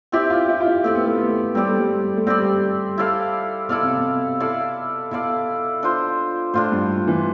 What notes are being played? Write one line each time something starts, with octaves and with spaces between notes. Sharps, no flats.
C4 E4 G4 D5
F4
E4
F4
E4
A3 C4 G4 D5
B3
A3
B3
A3
G3 C4 G4 D5
A3
G3
A3
G3 C4 G4 D5
E4 A4 D5 F5
B2 E4 A4 D5 F5
C3
B2
E4 A4 D5 F5
B2 E4 A4 D5 F5
D4 F4 C5
A2 D4 F4 C5
G2
E3